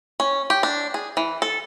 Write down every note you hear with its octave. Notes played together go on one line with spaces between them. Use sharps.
C#4
G4
D4
G#4
E3
A4